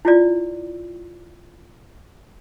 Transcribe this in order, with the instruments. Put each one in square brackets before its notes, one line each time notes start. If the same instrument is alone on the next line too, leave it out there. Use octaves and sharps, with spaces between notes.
[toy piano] E4 F4 D5